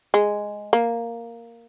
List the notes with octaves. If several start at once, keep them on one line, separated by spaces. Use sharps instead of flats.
G#3
A#3